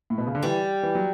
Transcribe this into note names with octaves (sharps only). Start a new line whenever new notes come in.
A2
B2
C#3
D3
E3 G3
E3
F#3